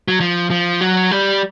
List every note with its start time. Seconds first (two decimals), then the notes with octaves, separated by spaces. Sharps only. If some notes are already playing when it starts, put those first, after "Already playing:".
0.08 F#3
0.20 F3
0.50 F3
0.81 F#3
1.11 G3